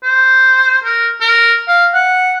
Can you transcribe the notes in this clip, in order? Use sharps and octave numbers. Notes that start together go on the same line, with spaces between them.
C5
A#4
A#4
F5
F#5